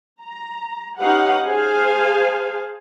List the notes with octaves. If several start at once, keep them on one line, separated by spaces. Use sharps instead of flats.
A#5
C#4 D#4 G4 B4 F5 F#5
G#4 C5 F5 G#5 A5